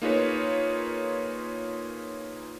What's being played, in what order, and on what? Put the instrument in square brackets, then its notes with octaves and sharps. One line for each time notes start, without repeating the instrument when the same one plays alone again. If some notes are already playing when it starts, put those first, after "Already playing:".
[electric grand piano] A#3 D#4 F4 G#4 B4 C#5